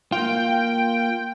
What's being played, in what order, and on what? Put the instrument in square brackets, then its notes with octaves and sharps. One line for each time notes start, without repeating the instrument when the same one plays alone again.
[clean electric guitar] A#3 F4 [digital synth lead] G5